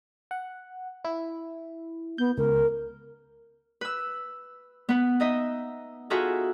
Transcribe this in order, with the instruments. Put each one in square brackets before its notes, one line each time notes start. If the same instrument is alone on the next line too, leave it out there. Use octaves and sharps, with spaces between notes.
[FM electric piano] F#5
E4
[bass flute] B3 [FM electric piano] G6
[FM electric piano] C#2 [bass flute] A#4
[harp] B4 E6
B3 B4
D#4 D#5 E5
D#4 F4 F#4 G#4 A4 E5